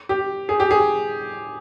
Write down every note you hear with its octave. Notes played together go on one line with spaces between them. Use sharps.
G4
G#4
G4
G#4